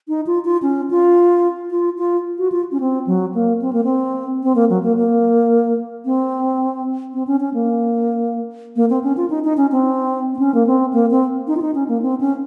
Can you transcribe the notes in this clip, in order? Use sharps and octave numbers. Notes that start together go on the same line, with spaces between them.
D#4
F4
F4
C#4
F4
F4
F4
F#4
F4
C#4
C4
F#3
A#3
C4
A#3
C4
C4
A#3
F#3
A#3
A#3
C4
C4
C#4
C#4
A#3
A#3
C4
C#4
F4
D#4
D#4
C#4
C4
C4
C#4
A#3
C4
A#3
C4
D#4
F4
D#4
C#4
A#3
C4
C#4